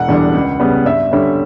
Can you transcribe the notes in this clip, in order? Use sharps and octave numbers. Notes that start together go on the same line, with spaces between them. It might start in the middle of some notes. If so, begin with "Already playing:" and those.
Already playing: E1 F#5
E2 D3 G3 D4
C#2
C#3 G3 B3
G2 E5
D3 G3 C#4